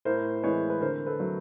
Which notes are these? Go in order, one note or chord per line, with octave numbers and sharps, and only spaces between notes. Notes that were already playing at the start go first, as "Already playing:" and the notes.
A2 A#4 C5
E3 G#3 B4 C#5
B4
D3 A#4 C5
A4 B4
F#3 A3